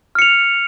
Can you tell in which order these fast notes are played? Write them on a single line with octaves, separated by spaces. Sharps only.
F6 C#7 F7